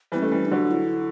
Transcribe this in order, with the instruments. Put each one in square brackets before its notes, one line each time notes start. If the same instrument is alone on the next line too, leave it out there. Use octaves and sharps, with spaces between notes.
[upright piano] E3 G3 [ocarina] B3
[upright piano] A3 [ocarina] C#4
[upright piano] E3 G3
[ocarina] D4
[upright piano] D3 F#3
[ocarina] E4